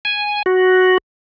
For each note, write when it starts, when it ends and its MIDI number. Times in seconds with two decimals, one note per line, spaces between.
0.05 0.42 80
0.46 0.98 66